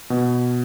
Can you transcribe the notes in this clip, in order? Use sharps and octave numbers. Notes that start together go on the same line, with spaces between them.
B2